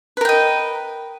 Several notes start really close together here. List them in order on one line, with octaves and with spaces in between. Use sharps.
B4 A#4 G5 D#5